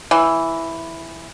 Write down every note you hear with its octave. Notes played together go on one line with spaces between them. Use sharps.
E3